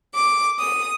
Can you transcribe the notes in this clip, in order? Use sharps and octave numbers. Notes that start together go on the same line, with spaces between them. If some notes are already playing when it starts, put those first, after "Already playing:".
D6
D#6